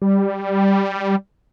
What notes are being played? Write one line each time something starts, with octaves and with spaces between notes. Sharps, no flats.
G3